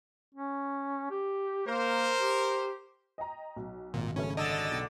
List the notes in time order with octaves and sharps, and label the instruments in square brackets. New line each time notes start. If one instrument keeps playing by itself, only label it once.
[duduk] C#4
G4
[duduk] A#3 [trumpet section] A#4 C5
[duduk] G4
[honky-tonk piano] D#5 G5 A#5
B1
[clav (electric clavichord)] G#1 [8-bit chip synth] A#2
[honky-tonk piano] F#2 C#3 A3 [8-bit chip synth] C#4
[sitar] D3 [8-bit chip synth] D#5 E6 A6
[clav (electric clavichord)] B1 G5